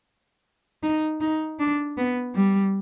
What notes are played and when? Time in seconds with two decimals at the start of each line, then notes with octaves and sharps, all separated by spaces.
0.83 D#4
1.21 D#4
1.59 D4
1.97 B3
2.35 G3